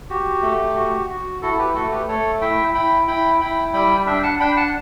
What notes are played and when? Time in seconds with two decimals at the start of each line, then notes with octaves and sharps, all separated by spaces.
0.10 F#4 G4
0.42 A3
0.76 F#4
1.09 F#4
1.42 E4 F#4 A4
1.58 G4 B4
1.75 A3 F#4 A4
1.91 G4 B4
2.08 A3 A4 C#5
2.41 E4 E5 G5
2.74 E4 G5 B5
3.07 E4 G5 B5
3.41 E4 G5 B5
3.73 G3 G5 B5
4.06 D4 E5 G5
4.23 F#5 A5
4.40 D4 G5 B5
4.56 F#5 A5